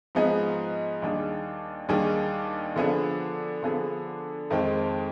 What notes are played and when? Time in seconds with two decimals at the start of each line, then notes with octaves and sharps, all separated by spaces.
0.15 G#2 F3 B3 D#4 G#4
1.02 D#2 D#3 G3 D4 G#4
1.89 D#2 D#3 G3 D4 G#4
2.76 D3 F3 B3 D4 G#4
3.63 D3 F3 B3 D4 G#4
4.50 F2 D#3 G#3 C4